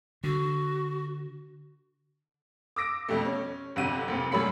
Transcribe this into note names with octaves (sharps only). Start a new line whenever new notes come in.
D3 F#4
D6 E6 A#6 D7
F2 B2 G3 A3
C#4
G1 F2 C3 F#3 F#5 D#7
F1 A#2 C4
F#2 A2 G3 C#5 B5 C#7